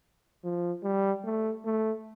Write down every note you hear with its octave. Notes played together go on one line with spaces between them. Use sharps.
F3
G3
A3
A3